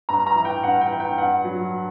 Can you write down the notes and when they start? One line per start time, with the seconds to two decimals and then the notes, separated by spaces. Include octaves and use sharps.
0.09 G2 A#5
0.26 A#5
0.36 E3
0.45 G5
0.63 G2 F#5
0.81 G5
0.90 E3
1.00 G5
1.18 G2 F#5
1.44 F#3